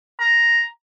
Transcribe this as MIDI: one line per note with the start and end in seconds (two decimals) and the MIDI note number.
0.20 0.64 82